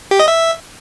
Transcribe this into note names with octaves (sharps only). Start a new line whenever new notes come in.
G4
D#5
E5